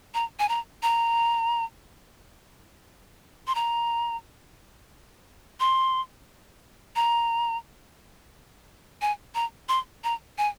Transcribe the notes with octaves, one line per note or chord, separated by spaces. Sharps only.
A#5
G#5
A#5
A#5
C6
A#5
C6
A#5
G#5
A#5
C6
A#5
G#5